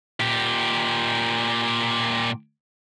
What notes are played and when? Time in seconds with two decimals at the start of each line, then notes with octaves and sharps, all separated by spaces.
0.21 A#2 G4